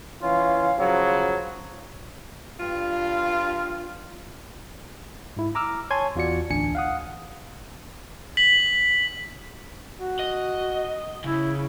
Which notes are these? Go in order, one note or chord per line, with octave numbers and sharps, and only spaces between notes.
E3 C#4 F4 F5
C#3 F3 F#3
G2 F4
G#2 E4
A#5 D6 E6 F6
C#5 G#5 A5 C6 G#6
E2 F4 F#4 D5 C#7
A1 D2 D4 G#5 C#7
F5 F#5 D#6
B6 F#7
F#4
D#5
C#3 E4